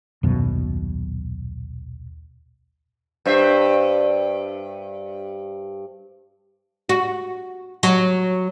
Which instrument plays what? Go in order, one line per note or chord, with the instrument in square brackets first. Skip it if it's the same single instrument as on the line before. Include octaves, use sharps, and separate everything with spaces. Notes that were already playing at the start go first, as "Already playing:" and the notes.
[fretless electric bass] D#1 B1 F#2 B2
[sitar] G2 C5 E5
[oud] F#4
F#3